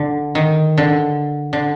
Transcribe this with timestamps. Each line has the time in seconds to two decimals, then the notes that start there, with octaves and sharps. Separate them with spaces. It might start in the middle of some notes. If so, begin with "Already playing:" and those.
Already playing: D3
0.35 D#3
0.78 D3
1.53 D3